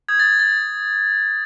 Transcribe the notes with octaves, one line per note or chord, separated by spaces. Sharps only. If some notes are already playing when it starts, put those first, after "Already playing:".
D#6 G6 G#6
A6
G#6
A6